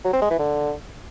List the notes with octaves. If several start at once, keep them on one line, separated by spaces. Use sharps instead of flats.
F#3
C4
G#3
E3
D3